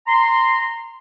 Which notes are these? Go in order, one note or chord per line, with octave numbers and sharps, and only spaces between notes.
A#5 C6